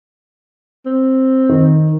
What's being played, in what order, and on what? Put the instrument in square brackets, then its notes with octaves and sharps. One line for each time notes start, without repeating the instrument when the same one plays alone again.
[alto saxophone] C4
[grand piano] D#3